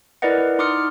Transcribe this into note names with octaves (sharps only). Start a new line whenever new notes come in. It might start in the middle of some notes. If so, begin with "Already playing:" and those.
E4 A#4 B4 D5 D#5 F#5
D#4 C6 D6 D#6 F6 C#7